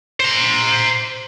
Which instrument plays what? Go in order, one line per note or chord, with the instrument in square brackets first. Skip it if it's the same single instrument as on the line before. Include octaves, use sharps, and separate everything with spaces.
[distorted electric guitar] C5 A#5